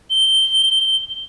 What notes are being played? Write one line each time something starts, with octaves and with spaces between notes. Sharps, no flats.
G7